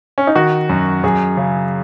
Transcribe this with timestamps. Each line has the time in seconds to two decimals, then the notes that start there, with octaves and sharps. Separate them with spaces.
0.18 C#4
0.27 D#4
0.35 D#3 F#4
0.69 F#2
1.03 F#2 G#4
1.37 C#3